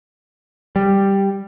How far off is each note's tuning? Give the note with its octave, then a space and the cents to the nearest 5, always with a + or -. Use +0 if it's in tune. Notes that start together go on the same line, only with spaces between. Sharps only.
G3 +5